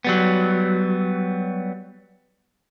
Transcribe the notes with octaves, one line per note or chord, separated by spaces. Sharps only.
F#3 G3 B3